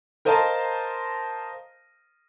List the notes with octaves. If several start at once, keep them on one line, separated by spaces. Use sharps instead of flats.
A#4 C5 D#5 F5 A5 A#5